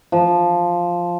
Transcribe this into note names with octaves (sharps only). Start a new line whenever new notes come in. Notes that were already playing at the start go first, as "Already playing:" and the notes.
F3